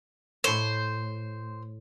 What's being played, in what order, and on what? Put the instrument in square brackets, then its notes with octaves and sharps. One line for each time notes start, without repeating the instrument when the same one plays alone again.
[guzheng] A2 C#5 [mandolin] C5